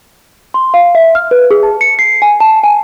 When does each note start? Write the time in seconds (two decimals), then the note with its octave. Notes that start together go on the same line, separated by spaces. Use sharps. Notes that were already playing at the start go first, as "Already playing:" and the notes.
0.54 C6
0.74 F5
0.95 E5
1.15 F6
1.31 B4
1.51 G#4
1.63 A5
1.81 C#7
1.99 C7
2.22 G#5
2.40 A5
2.64 G#5